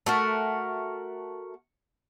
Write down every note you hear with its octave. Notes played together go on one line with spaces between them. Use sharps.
A3 F#4 A#4